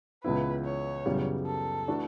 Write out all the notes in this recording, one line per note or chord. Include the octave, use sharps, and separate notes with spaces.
C#2 C#3 E3 B3 E4 B4
C#5
F#2 C#3 E3 G3 B3
A4
E3 A3 D4 F#4